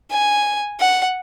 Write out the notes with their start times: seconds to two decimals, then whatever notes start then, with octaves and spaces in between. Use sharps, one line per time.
0.11 G#5
0.80 F#5